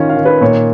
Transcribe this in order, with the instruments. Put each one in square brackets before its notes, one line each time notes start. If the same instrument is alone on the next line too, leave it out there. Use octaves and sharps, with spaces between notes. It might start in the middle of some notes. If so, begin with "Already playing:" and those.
Already playing: [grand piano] D#3 C#4 F4
[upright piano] F5
[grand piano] D#3
[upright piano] B4
[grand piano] A#2 [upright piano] C#5